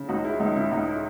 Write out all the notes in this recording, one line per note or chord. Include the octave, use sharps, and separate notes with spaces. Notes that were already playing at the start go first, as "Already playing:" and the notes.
Already playing: C#3
C#2 D#4 F#4
G#3 E4
C#2 D#4
C#3 E4
C#2 D#4
E4